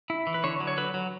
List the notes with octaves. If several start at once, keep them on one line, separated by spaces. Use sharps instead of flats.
E4
E3
B4
D3 C#5
F#3
C#5
F#3 B4
F#3